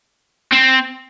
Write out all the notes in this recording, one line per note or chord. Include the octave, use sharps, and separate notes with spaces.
C4